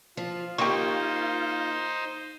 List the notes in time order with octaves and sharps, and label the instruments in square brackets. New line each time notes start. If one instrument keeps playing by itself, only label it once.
[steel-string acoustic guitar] F3 [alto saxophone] F4
[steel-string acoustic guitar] D#3 A#3 [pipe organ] D#4 C5 [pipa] G4 C#6